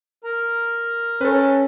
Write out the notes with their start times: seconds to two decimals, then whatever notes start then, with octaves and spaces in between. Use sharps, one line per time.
0.24 A#4 A#5
1.21 C#4 A4 B4